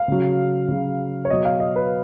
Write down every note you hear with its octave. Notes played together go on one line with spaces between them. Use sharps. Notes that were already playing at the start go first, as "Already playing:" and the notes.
Already playing: F5
C#3 F#3
C#3 F#3
C#5
B2 F#3 D#5
F5
D#5
B4